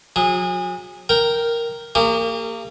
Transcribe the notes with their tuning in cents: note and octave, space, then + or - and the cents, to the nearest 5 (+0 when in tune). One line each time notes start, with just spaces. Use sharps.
F#3 -40 G#4 -25
A#4 +0 G5 -5
A#3 -30 G4 +45